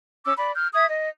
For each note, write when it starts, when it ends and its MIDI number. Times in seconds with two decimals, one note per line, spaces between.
0.25 0.32 61
0.25 0.32 86
0.25 0.32 88
0.37 0.51 74
0.37 0.51 83
0.56 0.67 89
0.56 0.67 91
0.74 0.86 76
0.74 0.86 87
0.74 0.86 92
0.88 1.08 75